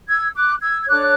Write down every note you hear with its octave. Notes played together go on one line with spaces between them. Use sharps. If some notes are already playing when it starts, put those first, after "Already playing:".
E6 G#6
D6 F#6
E6 G#6
G#6
D4 A4 C#5 D6 F#6